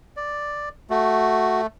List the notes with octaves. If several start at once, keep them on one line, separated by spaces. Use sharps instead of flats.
D5
A3 F#4